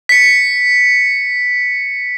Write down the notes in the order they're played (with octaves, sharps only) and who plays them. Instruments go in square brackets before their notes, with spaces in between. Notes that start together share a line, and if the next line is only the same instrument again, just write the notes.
[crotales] B6 C#7